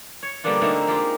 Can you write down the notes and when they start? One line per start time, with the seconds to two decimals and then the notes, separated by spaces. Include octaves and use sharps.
0.23 C#5
0.44 D3 G3 A#3 B3 D4 F4
0.61 D3 A3 A#3 C4 D#4
0.87 G#3 F4 G4